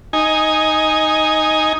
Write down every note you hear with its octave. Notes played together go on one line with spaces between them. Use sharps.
D#4 G#5